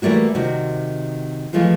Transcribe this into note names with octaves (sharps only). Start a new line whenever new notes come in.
E3 G3 A3 A#3 F#4
C3 D#3 F#4
E3 F3 G#3 A3 F4